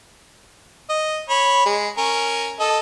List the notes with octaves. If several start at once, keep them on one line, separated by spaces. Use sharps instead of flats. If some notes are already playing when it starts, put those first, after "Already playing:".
D#5
C#5 B5
G#3
C#4 A#4
A4 D#5